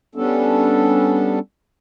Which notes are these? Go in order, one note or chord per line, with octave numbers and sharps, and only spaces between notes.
G3 B3 C#4 D4 A4